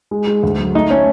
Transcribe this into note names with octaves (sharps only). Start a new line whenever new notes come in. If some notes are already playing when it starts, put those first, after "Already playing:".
G#3
G#3
D2
F#3
A3 D#4
A3 C#4